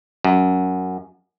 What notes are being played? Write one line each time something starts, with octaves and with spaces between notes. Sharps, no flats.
F#2